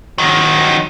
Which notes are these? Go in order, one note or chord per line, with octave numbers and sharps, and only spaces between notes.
D#3 F#3